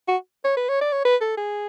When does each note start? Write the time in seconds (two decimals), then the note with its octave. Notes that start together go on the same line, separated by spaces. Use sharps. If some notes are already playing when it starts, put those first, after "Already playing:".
0.08 F#4
0.45 C#5
0.57 B4
0.69 C#5
0.81 D5
0.92 C#5
1.05 B4
1.21 A4
1.37 G#4